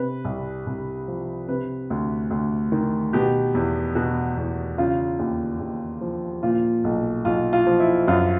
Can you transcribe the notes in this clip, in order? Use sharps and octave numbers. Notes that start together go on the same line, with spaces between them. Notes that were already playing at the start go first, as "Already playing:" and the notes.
Already playing: C3 B4
C2
C2
F3
C3 B4
D2
D2
D#3
B2 G4
E2
B2 F#4
E2
C#3 F4
D#2
D#2
F3
A#2 F4
B1
B1 F4
F4
F3
E4
F#2 F4